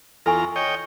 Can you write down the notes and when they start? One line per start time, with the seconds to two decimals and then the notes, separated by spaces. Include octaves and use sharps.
0.26 E2 F4 A4 G#5 A#5 C#6
0.56 C#5 D#5 G5